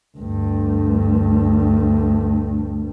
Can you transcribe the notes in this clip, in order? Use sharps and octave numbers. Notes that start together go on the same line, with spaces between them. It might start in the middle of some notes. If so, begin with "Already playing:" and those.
D2 G2